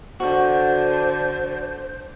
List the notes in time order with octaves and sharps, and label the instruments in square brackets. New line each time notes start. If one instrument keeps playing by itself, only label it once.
[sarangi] D3 [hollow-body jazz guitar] F#4 [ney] C5